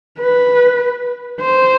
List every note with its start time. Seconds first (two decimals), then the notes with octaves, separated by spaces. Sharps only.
0.20 B4
1.42 C5